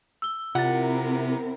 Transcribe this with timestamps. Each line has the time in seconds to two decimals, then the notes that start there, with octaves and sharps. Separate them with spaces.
0.22 E6 G7
0.55 C3 C4 E4 F4 A#4 F#5 A6